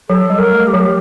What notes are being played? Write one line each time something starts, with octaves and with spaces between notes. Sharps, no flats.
F#3 A4
G3
A#4
A3
G4
F#3